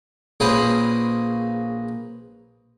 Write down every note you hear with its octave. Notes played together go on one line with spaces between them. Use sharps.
A#1 A#3 C#4 G#4 B4 C5